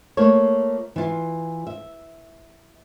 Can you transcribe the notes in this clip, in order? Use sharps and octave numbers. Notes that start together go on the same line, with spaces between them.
A3 A#3 F4 C#5
E3 F4
E5